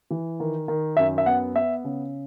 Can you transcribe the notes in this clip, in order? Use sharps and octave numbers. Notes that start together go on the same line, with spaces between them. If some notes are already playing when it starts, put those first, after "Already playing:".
E3
D#3
D#3
F#2 E5
E5
B3 F#5
B3 E5
C#3